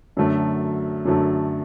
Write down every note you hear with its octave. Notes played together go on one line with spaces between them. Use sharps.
F#2 D3 F#3 A3
F#2 D3 F#3 A3